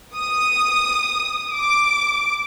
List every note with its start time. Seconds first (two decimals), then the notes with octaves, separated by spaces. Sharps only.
0.16 D#6
1.53 D6